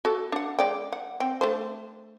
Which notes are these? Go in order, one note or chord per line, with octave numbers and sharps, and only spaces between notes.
F#4 A4
D4 F#5
G#3 D5 G5
F#5
C4 G5
A3 D4 C5